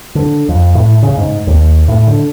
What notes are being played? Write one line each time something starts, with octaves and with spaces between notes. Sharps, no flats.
D3
F2
A2
C#3
G#2
D#2
A2
D3